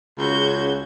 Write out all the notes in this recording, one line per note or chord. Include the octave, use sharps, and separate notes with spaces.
C#2 C#3 F#4 G6 G#6